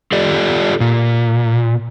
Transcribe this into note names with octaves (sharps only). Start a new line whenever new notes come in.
F4 G4 A4 D5
A#2